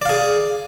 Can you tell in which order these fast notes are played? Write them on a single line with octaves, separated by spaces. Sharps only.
D5 F5 G#4